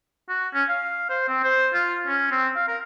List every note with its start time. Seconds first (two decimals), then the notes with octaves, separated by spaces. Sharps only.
0.29 F#4
0.54 C#4
0.69 F5
1.10 C5
1.29 C4
1.44 C5
1.74 F4
2.07 C#4
2.31 C4
2.56 F5
2.68 A#4